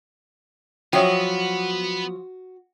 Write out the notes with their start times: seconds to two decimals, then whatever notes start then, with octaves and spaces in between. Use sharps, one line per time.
0.93 F3 F#3 B3 F#4 C#5 E5 G5